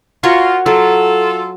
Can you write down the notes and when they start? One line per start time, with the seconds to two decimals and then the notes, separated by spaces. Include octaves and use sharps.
0.23 F4 F#4 A#4 C#5
0.66 F#3 F4 A4